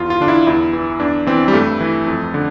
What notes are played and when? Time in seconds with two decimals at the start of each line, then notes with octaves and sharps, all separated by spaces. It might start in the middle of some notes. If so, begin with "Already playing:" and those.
Already playing: E2 F4
0.10 F4
0.20 D3 D4
0.28 E4
0.47 E2 E4
0.73 E3
1.00 E2 D4
1.27 E3 C4
1.48 G3
1.53 G2 A3
1.80 E3
2.07 F2
2.34 D3